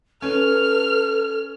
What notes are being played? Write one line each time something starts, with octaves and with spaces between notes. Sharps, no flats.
C#4 A4 B4 F6